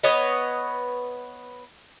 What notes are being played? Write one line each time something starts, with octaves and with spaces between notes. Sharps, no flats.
B3 B4 C#5 D#5